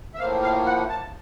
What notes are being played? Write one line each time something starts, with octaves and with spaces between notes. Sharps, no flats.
E5
A2 F3 A#3 F5
F5
F#5
A5